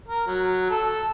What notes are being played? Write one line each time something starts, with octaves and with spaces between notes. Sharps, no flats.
A#4
F#3
A4